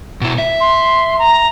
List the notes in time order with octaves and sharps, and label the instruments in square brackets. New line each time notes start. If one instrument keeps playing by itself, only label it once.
[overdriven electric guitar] B2 E4
E5
[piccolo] C6
A#5